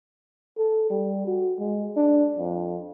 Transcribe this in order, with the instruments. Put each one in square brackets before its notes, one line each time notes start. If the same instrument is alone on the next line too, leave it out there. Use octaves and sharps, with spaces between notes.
[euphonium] A4
G3
F#4
G#3
D4
F2